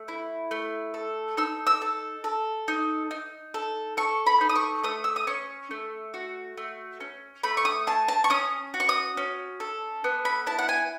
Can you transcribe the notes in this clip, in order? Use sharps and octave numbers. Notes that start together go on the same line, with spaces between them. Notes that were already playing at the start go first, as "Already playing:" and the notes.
Already playing: A3
E4
A3
A4
D#4 E6
E6
A4
A4
D#4
D#4
A4
A4 C#6
B5
D#4
D#6
C#6
A3 D#6
E6
D#6
C#4 C#6
A3
F#4
A3
C#4
A3 B5
C#6
D#6
G#4 A5
A5
C#6
C#4 D#6
F#4
C#6
D#6
C#4
A4
B3
B5
E4 A5
F#5
G#5